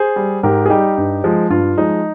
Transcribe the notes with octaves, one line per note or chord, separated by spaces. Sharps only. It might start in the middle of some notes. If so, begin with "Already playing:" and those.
Already playing: G#4 C5
G3
G#2 G4 A#4
G#4
G3 D#4 G4
G2
F3 G#3
G2 F4
F3 G#3 D#4